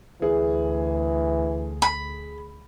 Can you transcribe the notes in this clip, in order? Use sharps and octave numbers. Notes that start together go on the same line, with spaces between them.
D2 E3 G#4
B5